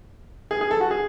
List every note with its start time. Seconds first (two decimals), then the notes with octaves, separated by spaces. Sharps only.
0.51 G#4
0.61 G#4
0.71 A4
0.81 F#4
0.91 G#4